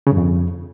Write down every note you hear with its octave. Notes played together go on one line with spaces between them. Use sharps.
C#3
G2
F2